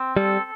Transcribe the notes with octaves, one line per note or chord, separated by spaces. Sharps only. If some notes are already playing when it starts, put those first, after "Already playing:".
Already playing: C4
G3 A4